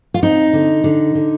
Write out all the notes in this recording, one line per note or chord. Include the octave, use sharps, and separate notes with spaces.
F4
C4 D#4
D3
D3
D3